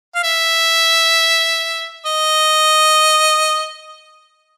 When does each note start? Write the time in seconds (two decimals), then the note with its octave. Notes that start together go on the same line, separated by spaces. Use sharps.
0.15 F5
0.24 E5
2.06 D#5